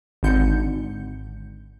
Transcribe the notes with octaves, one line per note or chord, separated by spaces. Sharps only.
G#1 D3 G6 C#7